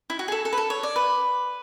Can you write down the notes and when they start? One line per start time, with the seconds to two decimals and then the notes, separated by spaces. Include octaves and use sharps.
0.10 E4
0.19 F#4
0.28 G#4
0.32 A4
0.45 A4
0.53 B4
0.57 A4
0.70 C#5
0.83 D5
0.96 B4